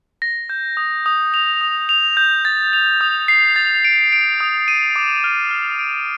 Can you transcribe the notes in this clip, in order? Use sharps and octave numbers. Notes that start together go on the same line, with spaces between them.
A#6
G6
D#6
D#6
F7
D#6
F7
G6
A6
F7
D#6
C7
A6
D7
D7
D#6
D#7
D6
F6
F6
D7